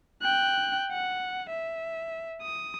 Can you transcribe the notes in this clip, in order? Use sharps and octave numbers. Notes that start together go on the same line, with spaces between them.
G5 F#6
F#5
E5
D#6